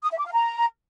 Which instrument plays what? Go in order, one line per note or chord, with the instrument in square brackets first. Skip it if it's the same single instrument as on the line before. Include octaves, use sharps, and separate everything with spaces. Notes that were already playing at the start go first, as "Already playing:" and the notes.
[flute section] D#6
E5
D6
F5
A#5